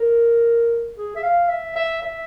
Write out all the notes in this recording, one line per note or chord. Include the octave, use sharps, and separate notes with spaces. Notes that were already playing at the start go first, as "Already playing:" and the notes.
Already playing: A#4
G#4
E5
F5
E5
E5
E5